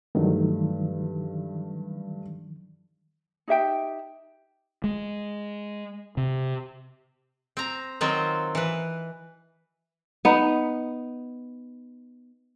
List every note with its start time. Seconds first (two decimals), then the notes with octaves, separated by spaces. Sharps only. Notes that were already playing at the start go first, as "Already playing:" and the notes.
0.15 G2 D#3 E3 F#3 A3
3.48 D#4 G4 E5 G5
4.84 G#3
6.17 C3
7.57 C4 A#5
8.01 D#3 F#3 C4 F4 C5
8.55 E3 B4
10.25 B3 D#4